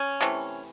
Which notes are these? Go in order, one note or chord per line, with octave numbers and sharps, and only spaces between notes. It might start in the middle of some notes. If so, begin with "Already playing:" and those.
Already playing: C#4
C3 E3 A3